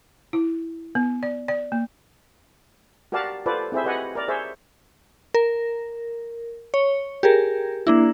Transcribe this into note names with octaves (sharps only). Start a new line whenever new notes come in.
E4
B3
D5
D5
A#3
F#4 G4 A#4 D5 F5 A5
F4 A4 B4 C5 D5
C4 E4 G#4 C5 E5
G4 B4 C#5 D#5 F#5 G#5
A#4 D5
G#4 C5 C#5 E5
A#4
C#5
G4 G#4 A#4
A#3 D4 E4